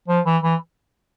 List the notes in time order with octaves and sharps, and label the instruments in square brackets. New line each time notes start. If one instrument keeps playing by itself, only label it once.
[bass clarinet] F3
E3
E3